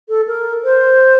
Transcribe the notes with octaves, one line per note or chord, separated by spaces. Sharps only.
A4
A#4
C5